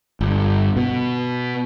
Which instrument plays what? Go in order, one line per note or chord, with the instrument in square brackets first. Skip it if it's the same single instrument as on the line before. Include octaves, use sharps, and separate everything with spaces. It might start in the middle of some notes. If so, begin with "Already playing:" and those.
[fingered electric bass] G1
B2